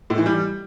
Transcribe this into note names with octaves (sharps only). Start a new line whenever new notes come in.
A2
E3
G3